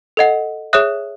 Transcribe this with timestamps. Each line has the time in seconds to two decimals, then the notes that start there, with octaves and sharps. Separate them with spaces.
0.17 A4 D#5 F#5
0.73 G#4 C#5 E5 D#6 F#6